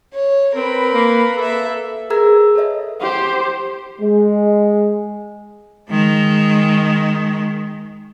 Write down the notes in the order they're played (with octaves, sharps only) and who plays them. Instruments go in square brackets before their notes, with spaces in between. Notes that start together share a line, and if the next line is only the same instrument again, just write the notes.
[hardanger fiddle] C#5
[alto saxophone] C4 [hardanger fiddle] A#4 B5 [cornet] B4
[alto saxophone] A#3
[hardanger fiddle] A#3 E5 [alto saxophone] A4
[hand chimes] G#4 A#4 B4 A#5 E6 G#6
A4 B4 C#5 D#5 E5
[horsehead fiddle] G4 C5
[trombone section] G#3
[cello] D#3 G#3